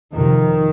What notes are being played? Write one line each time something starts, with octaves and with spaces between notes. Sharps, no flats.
F2 C3 D#3